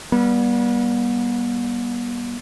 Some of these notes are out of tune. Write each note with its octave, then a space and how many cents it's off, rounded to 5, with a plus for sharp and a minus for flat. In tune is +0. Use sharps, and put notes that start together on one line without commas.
G3 +0 B3 -40